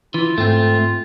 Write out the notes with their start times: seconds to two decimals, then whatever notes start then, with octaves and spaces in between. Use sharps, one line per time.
0.14 E3 F4
0.38 G#2 A3 C4